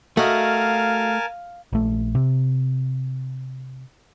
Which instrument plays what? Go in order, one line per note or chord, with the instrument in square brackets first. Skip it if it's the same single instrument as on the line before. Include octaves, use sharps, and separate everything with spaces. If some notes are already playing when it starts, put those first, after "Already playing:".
[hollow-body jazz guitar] A3 [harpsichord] F#4 D#5 [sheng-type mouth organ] A#4 G#5 A5 [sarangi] F5
[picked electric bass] A#1 A3
C3